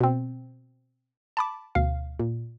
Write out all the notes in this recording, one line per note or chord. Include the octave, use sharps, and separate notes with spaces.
B2 C4
A5 B5 D6
D2 B2 F5
A#2